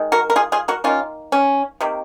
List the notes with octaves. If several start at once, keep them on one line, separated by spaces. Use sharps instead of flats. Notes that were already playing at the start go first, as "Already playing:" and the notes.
Already playing: D#3 G#3
F#4 A#4
A#4
F4 G#4
F4 G#4
F#4 A#4
D#3 A#3 C#4 F4
C#4
C3 D#3 A#3